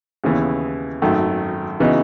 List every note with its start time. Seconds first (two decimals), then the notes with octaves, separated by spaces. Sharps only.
0.24 D#2 C#3 E3 B3
1.02 G#1 F#2 D#3 A3
1.80 C#3 E3 B3 D#4 F#4